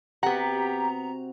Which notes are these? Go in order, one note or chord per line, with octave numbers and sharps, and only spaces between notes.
C3 B3 C4 F#4 G4 F#5 A#5